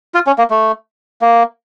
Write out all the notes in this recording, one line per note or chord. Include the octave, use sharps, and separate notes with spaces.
F4
C#4
A#3
A3
A#3